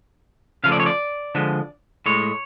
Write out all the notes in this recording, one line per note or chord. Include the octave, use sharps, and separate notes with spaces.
C#3 F3 A3 F5
D5
C#5
D5
D3 F3 G#3
A2 G#3 C#5